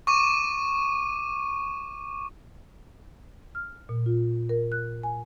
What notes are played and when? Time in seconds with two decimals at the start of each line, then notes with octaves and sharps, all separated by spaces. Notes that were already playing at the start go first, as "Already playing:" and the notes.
0.07 C#6 D6 D#7
3.55 F6
3.89 A#2
4.06 F4
4.49 A#4
4.72 F#6
5.03 G#5